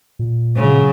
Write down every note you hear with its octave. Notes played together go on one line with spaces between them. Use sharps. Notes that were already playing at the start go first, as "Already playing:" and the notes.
A#2
C#3 F#3